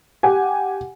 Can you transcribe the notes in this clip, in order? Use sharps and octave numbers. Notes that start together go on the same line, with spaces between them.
G4 F#5 G#5